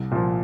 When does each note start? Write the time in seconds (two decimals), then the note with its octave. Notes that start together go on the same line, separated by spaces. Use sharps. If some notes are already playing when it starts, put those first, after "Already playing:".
Already playing: C2
0.11 A#2 F3